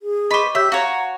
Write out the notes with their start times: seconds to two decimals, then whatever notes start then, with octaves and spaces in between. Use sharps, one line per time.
0.02 G#4
0.31 B4 C5 D#5 C#6 D6
0.55 G4 C#5 E5 E6 G6
0.72 F#4 C#5 F5 A#5